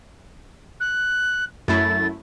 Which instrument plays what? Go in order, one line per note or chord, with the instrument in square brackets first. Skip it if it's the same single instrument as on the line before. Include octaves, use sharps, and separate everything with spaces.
[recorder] F#6
[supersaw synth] F#2 A3 E4 [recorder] A6